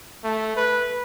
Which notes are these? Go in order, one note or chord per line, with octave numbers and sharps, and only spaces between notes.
A3
B4